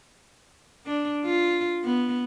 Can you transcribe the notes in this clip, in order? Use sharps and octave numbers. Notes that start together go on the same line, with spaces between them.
D4
F4
B3